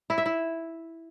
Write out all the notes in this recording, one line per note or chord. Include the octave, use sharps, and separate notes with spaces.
E4
E5
E4